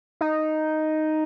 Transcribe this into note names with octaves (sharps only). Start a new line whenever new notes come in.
D#4